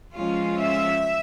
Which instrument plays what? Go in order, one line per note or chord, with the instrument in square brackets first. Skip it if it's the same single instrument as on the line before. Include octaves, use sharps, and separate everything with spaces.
[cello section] F3 G#3 C#4 F4
E5